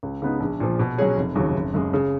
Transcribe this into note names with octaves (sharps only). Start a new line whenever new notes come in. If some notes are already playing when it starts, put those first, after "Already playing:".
C#2
C#3 G#3 B3 D#4
A#1
A#2 F3
B2
F#3 C#4 G#4 C#5
F1
D#2 C#3 F#3
F#1
F#2 C#3 G#3
C#3